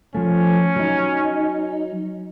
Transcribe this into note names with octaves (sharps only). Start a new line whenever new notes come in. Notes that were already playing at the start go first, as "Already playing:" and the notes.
F3 A3 C#4
F#3 D#4